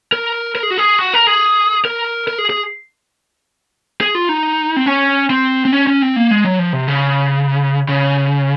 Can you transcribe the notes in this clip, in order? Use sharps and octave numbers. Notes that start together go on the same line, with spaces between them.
A#4
A#4
G#4
F#4
G#4
F#4
A#4
G#4
A#4
A#4
G#4
G#4
G#4
F4
D#4
C4
C#4
C4
C4
C#4
C#4
C4
A#3
G#3
F#3
F3
C3
C#3
C#3